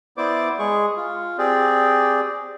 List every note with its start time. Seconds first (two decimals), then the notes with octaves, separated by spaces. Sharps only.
0.17 B3 E4 C5 D5 D6
0.59 G#3 G#4 C#6
0.97 F4
1.38 C4 G4 G#4 D5